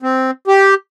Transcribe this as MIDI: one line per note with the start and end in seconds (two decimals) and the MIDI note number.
0.02 0.31 60
0.48 0.74 67